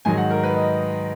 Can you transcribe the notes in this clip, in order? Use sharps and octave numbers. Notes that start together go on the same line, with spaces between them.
G#2 D#3 F#3 G#5
F#5
A#4
B4
D#5